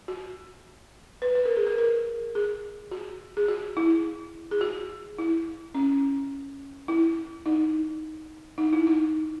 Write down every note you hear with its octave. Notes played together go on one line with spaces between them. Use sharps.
F#4
B4
B4
A#4
G#4
A#4
A#4
G#4
F#4
G#4
F#4
E4
G#4
F#4
E4
C#4
E4
D#4
D#4
E4
D#4